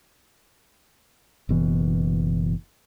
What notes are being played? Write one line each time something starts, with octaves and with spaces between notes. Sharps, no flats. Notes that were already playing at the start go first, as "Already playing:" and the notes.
F#1 B2 E3